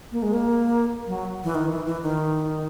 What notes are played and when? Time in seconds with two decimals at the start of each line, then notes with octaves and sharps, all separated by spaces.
0.12 A#3
0.23 G#3
0.33 A#3
1.07 F#3
1.44 E3
1.55 D#3
1.71 E3
1.86 E3
2.03 D#3